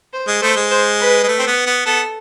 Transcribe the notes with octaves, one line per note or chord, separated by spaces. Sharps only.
C5
G#3
A3 C5
G#3
C5
B4
G#3
A3
C4
B3
B3
B3 A4